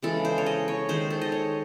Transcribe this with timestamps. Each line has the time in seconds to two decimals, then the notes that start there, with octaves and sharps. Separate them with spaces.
0.03 C#3 E3 G#3 A4
0.25 C5
0.38 C#5
0.46 D#5
0.68 C#5
0.89 D#3 G#3 C5
1.10 A4
1.22 D#5
1.32 C#5